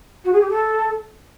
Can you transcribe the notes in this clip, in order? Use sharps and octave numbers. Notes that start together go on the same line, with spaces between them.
F#4
G#4
G4
A4